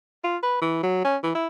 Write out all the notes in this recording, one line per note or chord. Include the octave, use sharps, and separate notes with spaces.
F4
B4
E3
F#3
C#4
E3
E4